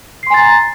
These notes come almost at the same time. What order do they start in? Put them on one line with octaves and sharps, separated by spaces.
C7 C6 G#5 A6 A#5